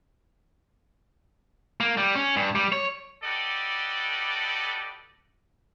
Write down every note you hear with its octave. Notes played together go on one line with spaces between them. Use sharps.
A#3
G3
C#4
G2
G3
C#5
F#4 G4 A4 B4 D5 D#5